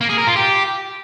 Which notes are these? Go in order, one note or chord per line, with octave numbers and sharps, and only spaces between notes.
A#3
G#4
A#4
F4
G4